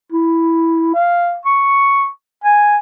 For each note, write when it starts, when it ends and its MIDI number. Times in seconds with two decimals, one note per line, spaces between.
0.12 0.90 64
0.94 1.38 77
1.45 2.07 85
2.44 2.77 80